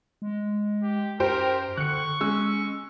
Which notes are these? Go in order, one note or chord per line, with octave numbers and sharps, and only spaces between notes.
G#3
G4
F#2 G4 A#4 C5 G5
D3 C#6 F#6 C#7
G#3 C#4 E6